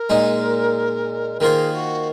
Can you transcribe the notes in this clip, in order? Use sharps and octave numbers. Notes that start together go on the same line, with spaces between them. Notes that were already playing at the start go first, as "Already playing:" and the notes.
Already playing: A#4
A#2 G#3 D#4
D#3 A#3 F4 G#4 C5
F#4